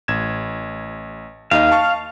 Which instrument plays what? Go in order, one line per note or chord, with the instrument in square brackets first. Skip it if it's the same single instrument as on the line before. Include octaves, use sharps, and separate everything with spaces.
[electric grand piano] A1 G#6 E7
[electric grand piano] D#2 D#4 D#5 [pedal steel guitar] F5
[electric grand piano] A5 C#6